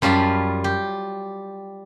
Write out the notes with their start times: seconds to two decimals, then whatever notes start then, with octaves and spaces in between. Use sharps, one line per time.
0.02 F#2 G3 F4 A5 B5
0.64 G4